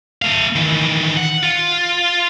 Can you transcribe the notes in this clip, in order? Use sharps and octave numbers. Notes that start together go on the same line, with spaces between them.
A3 F5
D#3 E3
F#5
F4